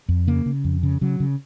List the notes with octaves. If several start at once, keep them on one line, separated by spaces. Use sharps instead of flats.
F2
C#3 A#3
C#3
F2
C#3
C#3 F#3
C#3